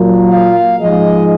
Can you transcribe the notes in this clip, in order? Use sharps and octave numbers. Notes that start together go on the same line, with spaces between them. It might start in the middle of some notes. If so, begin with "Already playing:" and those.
Already playing: A#2 F#3 A#3
F5
G#2 F3 G#3 D#5